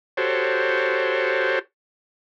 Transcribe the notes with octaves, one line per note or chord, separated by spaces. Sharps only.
F#4 G4 A4 C5 C#5